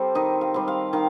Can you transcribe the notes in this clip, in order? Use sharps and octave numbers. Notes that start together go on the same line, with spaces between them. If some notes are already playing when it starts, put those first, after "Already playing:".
Already playing: G3 C4 G4 A4 C5
D#3 D#5
F5
G3 C4
F5
D#3 F5